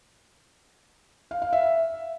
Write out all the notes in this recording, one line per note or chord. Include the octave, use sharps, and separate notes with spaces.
F5
F5
E5